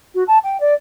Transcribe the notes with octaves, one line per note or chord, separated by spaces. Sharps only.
F#4
A5
G5
D5